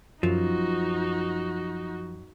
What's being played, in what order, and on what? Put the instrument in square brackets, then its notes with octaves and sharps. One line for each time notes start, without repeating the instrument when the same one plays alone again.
[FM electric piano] F#2 [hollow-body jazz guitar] F3 [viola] D#4 F#4